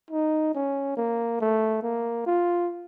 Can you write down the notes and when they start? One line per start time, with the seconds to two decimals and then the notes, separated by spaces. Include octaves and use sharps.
0.11 D#4
0.55 C#4
0.97 A#3
1.41 A3
1.83 A#3
2.26 F4